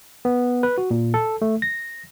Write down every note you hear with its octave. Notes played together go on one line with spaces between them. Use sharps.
B3
B4
F#4
A#2
A4
A3
A#6